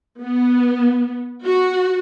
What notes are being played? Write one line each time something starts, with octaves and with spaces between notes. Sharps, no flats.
B3
F#4